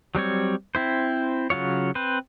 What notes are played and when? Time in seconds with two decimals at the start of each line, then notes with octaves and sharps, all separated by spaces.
0.15 F#3 G3 C4 C#5
0.75 C4 E4 C5
1.50 C#3 F#3 F4 C#5
1.95 C4 B4 C5